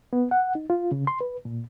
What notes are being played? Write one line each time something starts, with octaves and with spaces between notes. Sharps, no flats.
B3
F#5
D#4
F4
C#3
C6
B4
A#2